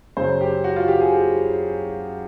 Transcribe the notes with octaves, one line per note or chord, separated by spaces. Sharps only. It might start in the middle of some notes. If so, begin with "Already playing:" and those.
F#2 C#3 F#3 C5
G4
F#4
F4
G4
G#4